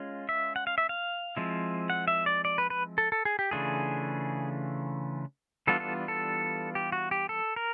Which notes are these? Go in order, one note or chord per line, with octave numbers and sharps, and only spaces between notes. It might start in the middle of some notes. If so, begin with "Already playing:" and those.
Already playing: G#3 C#4 F4
E5
F#5
F5
E5
F5
F3 G#3 C4 E4
F#5
E5
D5
D5
B4
B4
A4
A4
G#4
G4
C#3 E3 A3 D4 F4 G#4
E3 G3 B3 D4 F4 A4
A4
A4
G4
F#4
G4
A4
A#4